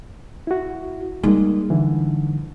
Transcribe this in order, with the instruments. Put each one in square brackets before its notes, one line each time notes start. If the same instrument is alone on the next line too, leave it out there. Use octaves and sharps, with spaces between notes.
[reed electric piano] E4 F#4
[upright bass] G3 D#4 [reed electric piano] G#3 A#3
[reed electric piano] D3 E3